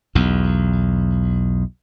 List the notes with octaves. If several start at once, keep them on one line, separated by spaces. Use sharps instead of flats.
B1 E2